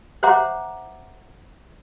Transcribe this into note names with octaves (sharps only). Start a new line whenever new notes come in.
C5 C#5 E5 F#5 A#5 D6